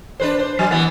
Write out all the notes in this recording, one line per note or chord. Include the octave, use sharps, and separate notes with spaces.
D4 B4 C5
C5
F#3
E3 B3